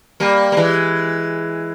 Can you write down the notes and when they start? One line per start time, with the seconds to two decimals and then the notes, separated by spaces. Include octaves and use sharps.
0.20 G3 A#3
0.52 A#3
0.57 E3 G#3